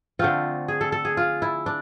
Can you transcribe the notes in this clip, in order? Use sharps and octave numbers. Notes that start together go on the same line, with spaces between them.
D3 A3 C4 F4
G#4
A4
A4
G#4
F4
E4
D4